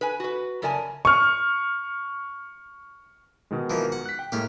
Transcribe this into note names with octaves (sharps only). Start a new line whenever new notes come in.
B4 G#5
F#4 B4
F#2 C#3 A#4 D5 G#5 A5
C#6 F6
B2 D#3 G#3
E3 F3 A#3
F#5
F#6 B6
G5
A2 G#3 A#3 G4 F5